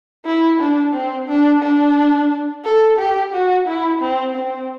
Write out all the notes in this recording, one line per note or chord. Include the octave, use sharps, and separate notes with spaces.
E4
D4
C4
D4
D4
A4
G4
F#4
E4
C4
C4